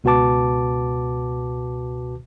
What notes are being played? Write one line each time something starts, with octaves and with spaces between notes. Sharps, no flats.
C#2 B2 F#4 B4 A5 D6